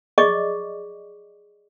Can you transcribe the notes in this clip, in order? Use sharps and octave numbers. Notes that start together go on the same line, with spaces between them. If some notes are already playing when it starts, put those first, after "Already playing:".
G#4 D5 D#5 C#6 D6